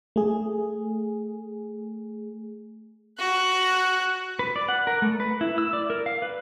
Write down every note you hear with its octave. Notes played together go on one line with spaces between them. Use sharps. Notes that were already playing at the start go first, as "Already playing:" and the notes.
A3 G#4
F#4 F#6
B4
D5
F#5
A#4
A3
B4
E4
E6
D5
A#4
F5
B4